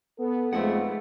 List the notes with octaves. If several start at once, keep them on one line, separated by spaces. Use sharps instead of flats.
B3 A4
F2 G#3 A3 D#4 F#5